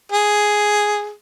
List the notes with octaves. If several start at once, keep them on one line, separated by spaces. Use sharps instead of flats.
G#4